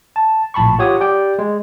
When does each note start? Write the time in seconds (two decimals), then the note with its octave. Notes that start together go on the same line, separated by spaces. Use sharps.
0.16 A5
0.54 A#1 A2 A5 B5 C#6
0.79 F4 G4 C#5 F#5 D#6
1.00 G4 D5 G5
1.39 G#3